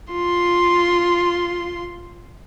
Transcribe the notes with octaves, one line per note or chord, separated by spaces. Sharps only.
F4 C6